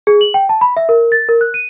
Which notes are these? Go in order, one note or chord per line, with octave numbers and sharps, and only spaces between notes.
G#4
F#7
G5
A5
B5
E5
A#4
A6
A#4
F#6
D#7